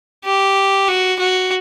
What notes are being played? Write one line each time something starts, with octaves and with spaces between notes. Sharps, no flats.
G4
F#4
F#4